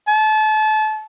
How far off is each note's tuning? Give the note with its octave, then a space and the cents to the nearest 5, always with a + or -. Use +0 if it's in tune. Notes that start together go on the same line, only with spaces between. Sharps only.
A5 -30